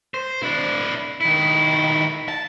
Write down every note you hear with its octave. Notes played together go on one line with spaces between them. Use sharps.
C5
D4 E4
D#3 E4
A5